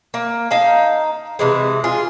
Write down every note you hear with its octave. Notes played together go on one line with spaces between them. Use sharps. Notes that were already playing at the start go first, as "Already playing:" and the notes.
A#3
D#4 F5 A5
C3 E3 G#3
F4 G#4